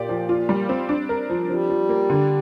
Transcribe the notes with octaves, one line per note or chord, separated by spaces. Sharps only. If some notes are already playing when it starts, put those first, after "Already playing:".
Already playing: A#2 G4 D5
F3
F4
G3
C4
D4
A#4
F3
F3 G3
F3
A#3
D3